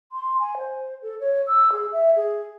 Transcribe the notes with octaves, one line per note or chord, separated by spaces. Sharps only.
C6
G#5
C5
A4
C#5
E6
G#4
E5
G#4